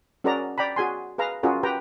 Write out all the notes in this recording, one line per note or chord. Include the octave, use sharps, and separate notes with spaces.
C#4 F#4 G#4 A#4 D5 A#5
D5 G5 A#5 B5
F#4 G#4 G#5 C6
G#4 B4 F5 A#5
C#4 F4 F#4 G#4 A#4
G4 B4 G5 A#5